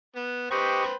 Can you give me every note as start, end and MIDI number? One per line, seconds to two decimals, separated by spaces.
0.16 0.51 59
0.51 0.84 67
0.51 0.93 71
0.51 0.93 72
0.51 0.84 75
0.51 0.93 79
0.51 0.84 85